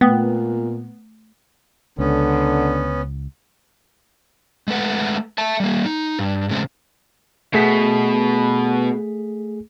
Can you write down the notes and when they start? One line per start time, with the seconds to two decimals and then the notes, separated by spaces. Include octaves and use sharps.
0.01 A#2 A3 B3 G5 D#6
1.99 C#2 D3 B3 C#4
4.68 G#3 A3 B4 F#5
5.38 E5 A5
5.60 G3 A#3
5.85 D#4
6.19 G2
6.49 A2 C#3 G#3 C4
7.54 B2 A3 G#4 B6